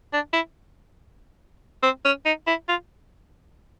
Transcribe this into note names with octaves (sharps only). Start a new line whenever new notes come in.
D4
E4
C4
C#4
D#4
E4
F4